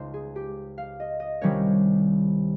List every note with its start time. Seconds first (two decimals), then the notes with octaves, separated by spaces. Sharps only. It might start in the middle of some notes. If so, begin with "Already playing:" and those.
Already playing: C#2 C#3 G#3 D#4 C5
0.14 G#4
0.36 G4
0.78 F5
1.00 D#5
1.20 D#5
1.41 C2 C3 D#3 G3 C#4 C#5